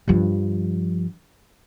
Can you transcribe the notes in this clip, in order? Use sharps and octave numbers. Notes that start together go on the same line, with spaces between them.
G2 F3